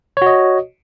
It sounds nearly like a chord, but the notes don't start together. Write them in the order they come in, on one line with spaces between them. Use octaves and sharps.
C#5 F#4 D#5